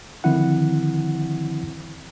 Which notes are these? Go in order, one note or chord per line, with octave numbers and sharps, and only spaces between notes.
D3 D#3 F3 C4 E4 F#5